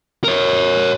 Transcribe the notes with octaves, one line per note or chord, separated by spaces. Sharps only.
A#4 C#5